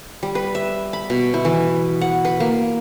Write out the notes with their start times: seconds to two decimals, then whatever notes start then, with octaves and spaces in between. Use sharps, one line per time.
0.23 G3
0.35 B4
0.55 E5
0.93 B5
1.10 B2
1.34 E4
1.45 E3
2.01 F#5
2.25 B4
2.40 A#3